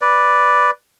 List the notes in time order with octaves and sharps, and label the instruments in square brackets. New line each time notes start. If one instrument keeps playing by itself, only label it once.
[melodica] B4 D5